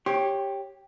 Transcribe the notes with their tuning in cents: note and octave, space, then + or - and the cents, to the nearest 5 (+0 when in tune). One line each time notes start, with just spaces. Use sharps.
G4 +5 C#5 -10 C6 +30